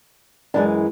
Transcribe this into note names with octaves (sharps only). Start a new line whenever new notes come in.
F#2 E3 G#3 D4